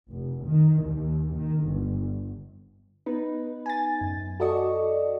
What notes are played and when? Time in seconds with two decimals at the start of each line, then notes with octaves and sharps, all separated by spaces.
0.11 F1
0.46 D#3
0.84 D#2
1.35 D#3
1.66 G1
3.06 B3 D#4 B4
3.66 G#5 A6
4.01 F#2
4.40 F#4 A4 D5 D#5 C#6